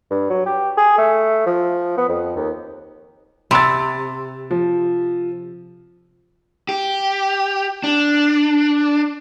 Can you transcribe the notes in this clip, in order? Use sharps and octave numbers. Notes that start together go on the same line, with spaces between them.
G2
F#3
G4
G#4
A3
F3
B3
F2
D#2
C3 B5 E6 A6
F3
G4
D4